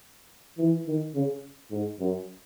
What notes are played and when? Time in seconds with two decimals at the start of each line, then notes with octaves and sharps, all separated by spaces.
0.58 E3
0.87 D#3
1.15 C#3
1.71 G#2
2.00 F#2